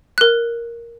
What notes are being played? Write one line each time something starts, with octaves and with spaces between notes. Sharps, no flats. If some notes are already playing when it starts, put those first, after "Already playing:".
A#4 F#6